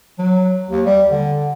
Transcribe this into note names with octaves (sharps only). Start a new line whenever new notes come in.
F#3
D#2
G3
D3